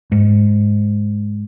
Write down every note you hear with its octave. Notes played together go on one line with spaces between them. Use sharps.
G#2